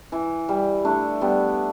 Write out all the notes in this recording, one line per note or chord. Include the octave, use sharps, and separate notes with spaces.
E3
G3
A3 D4
G3 B3